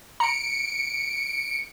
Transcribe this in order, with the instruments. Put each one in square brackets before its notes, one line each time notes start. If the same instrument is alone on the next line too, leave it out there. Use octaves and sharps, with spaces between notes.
[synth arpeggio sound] A#5 [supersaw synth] C#7 D7